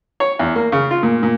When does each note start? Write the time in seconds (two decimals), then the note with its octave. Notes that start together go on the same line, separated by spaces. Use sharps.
0.20 C#5
0.39 E2
0.56 A#3
0.72 C#3
0.91 F4
1.03 A#2
1.23 A#2